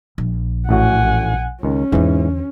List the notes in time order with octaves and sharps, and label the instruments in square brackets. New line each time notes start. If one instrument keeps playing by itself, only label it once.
[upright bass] A#1
[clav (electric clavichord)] A1 A2 F#4 [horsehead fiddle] F#5 G#5
[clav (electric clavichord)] C#2 D#3 [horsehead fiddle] C#4
[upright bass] E2 D3 [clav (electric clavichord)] G#2 E3